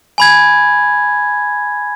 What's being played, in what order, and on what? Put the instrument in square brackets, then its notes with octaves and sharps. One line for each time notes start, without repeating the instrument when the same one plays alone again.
[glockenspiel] G#5 B5 G#6